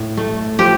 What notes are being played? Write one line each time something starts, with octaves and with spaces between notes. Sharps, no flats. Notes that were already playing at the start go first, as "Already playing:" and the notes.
Already playing: A2
A3
F3 G4